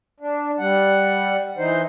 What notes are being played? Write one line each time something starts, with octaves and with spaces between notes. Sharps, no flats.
D4
G3 F#5
E3 D#4 C5